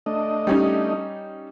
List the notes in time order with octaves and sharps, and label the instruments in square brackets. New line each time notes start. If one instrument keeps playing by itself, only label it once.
[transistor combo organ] A3 D4 D#5
[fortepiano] G3 C#4 D#4